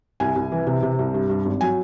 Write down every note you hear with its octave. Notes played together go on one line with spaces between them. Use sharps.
C2 G#5
C2
E3
C3
C3
C2
G2
G2
G#1
F#3 G#5